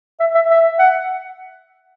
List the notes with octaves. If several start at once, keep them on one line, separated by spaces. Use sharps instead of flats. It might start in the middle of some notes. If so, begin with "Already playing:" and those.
E5
E5
E5
F#5